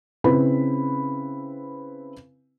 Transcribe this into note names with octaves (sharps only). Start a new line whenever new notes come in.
C#3 C4 E4 B4 B5